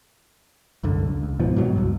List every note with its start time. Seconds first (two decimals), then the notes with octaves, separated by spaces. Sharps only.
0.83 C2 F#2 D3
1.08 C#2
1.23 C#2
1.39 G#2 B2 E3 F3
1.56 G#2 B2 F#3
1.75 C#2 G2